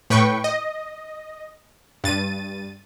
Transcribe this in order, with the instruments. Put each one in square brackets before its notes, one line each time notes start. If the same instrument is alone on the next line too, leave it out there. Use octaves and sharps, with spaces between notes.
[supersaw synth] A2 B4 G5 C#6
D#5
G2 A6 D#7